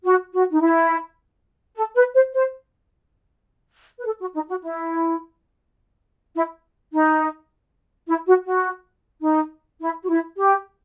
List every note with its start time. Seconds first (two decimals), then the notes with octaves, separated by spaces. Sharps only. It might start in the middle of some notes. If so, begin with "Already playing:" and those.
0.05 F#4
0.33 F#4
0.52 D#4
0.61 E4
1.76 A4
1.96 B4
2.14 C5
2.34 C5
3.99 B4
4.06 A4
4.20 F#4
4.34 D#4
4.49 F#4
4.63 E4
6.35 E4
6.93 D#4
8.08 E4
8.27 F#4
8.45 F#4
9.22 D#4
9.80 E4
10.03 F#4
10.09 E4
10.37 G4